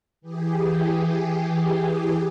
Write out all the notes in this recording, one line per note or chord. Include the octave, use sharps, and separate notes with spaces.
E3 G4 G#4